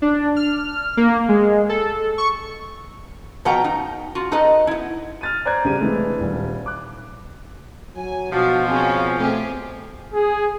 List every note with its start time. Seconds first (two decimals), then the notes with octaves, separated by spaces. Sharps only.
0.02 D4
0.36 F6
0.97 A#3
1.29 G#3
1.69 A4
2.18 C#6
3.45 B2 F3 B4 F#5 G5 A#5
3.64 D#4
4.15 F4 F#4
4.32 D#4 A4 B4 D#5
4.67 B3 E4
5.21 F6 A6 D#7
5.45 C5 D5 A#5 F#6 G#6
5.64 F#2 C#3 G3 G4 D#7
5.80 C3 E3 G#3 A3 D4
6.20 D#1 G3
6.66 D6 F#6
7.96 F#3 G#5
8.33 B2 F3 D4 F#4
8.68 C#3 C4 C#4
9.20 A3 C4 G4 G#4
10.13 G#4